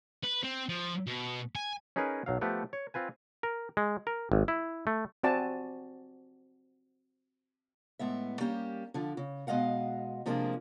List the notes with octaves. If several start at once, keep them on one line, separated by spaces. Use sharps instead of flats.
B4
C4
F3
B2
G#5
C#4 D#4 G#4 A#4 B4
B1 F#3 F5
F3 A3 B3 G4 B4
C#5
C4 F4 B4 G#5
A#4
G#3
A#4
G#1
E4
A3
C4 F#4 D5 G#5 A5
A2 G#3 B3 E5
G3 A#3 C#4 G4
D3 F3
C#3
B2 G#3 D#5 F5 F#5
C3 F3 G#3 A#3 D4 G#4